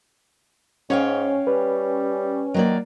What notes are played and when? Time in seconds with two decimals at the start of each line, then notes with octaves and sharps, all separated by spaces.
0.90 G#2 C#4 C#5 F5 G5
1.47 G3 B4
2.54 D#3 F#3 A#3 D5